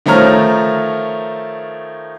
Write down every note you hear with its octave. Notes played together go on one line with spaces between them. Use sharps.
D#3 F3 A3 C#5 A#5 F6